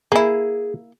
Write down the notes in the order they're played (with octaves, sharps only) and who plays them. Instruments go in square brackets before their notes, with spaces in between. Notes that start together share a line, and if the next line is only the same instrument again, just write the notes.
[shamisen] A#3 E4 [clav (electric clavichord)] G#4